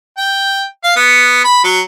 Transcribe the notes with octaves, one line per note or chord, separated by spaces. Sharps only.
G5
F5
B3
B5
F#3